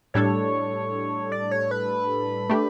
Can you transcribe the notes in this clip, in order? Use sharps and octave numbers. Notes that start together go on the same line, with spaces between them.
A2 G3 D4 A4 C#5
D5
C#5
B4
A3 D4 G4